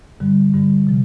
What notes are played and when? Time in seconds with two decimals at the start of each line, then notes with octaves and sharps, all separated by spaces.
0.20 G2 D3 G3
0.54 G2 D3 G3
0.87 C3 F3